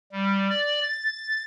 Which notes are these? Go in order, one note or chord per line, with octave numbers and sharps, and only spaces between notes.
G3
D5
A6